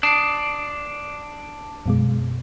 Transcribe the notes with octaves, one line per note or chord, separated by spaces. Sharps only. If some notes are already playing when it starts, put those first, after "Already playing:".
D4 D#6 C7 D7
F#2 B2 G#3